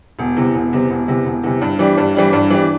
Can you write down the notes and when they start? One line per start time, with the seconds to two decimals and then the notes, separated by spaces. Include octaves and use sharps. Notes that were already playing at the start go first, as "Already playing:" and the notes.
0.19 E1
0.37 E2 C3
0.54 E1
0.73 E2 C3
0.90 E1
1.08 E2 C3
1.26 E1
1.43 E2 C3
1.61 G2
1.79 E3 G3 D4
1.97 G2
2.14 E3 G3 D4
2.33 G2
2.50 E3 G3 D4